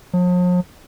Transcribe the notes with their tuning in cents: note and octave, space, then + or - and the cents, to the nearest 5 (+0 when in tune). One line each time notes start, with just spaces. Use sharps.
F3 +45